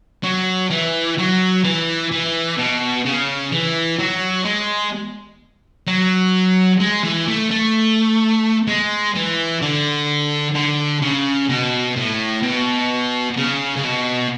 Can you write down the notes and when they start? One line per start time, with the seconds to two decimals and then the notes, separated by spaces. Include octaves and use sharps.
0.24 F#3
0.70 E3
1.18 F#3
1.64 E3
2.12 E3
2.58 B2
3.05 C#3
3.52 E3
3.99 F#3
4.45 G#3
5.87 F#3
6.80 G#3
7.03 E3
7.28 A3
7.51 A3
8.67 G#3
9.15 E3
9.62 D3
10.55 D3
11.02 C#3
11.49 B2
11.96 A2
12.42 B2
13.37 C#3
13.76 C#3
13.84 B2